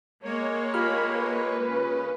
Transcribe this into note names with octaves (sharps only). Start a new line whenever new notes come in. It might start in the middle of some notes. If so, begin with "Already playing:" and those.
G#3 A#3 C#5
F4 G4 B5 F6
B4
C#3 C#4